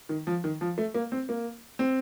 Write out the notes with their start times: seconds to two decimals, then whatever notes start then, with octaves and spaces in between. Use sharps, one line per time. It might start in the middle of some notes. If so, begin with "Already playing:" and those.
0.09 D#3
0.27 F3
0.44 D#3
0.61 F3
0.78 A3
0.95 A#3
1.12 C4
1.29 A#3
1.79 C4